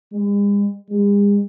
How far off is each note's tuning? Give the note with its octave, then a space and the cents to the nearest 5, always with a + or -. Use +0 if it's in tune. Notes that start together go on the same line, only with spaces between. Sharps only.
G#3 -45
G#3 -45